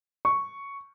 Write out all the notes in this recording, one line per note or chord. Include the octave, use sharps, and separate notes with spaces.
C#6